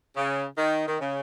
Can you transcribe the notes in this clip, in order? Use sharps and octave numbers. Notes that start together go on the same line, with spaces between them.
C#3
D#3
D#3
C#3